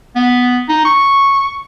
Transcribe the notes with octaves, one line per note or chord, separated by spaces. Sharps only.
B3
D#4
C#6